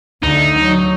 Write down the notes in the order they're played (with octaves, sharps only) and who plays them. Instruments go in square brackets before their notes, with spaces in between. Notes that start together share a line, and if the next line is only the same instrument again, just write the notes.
[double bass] D2 D3 [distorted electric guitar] D#4
[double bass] F#3